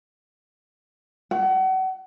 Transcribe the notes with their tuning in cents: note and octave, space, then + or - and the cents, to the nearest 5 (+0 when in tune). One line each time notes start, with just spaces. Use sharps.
F#5 +35